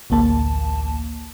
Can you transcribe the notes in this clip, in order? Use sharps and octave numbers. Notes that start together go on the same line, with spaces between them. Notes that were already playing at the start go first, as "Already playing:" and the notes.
A1 D2 A#3 A5